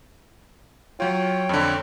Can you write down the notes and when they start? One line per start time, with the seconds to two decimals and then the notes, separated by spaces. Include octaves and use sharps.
1.00 F#3 F4 C#5 G5
1.49 F2 D3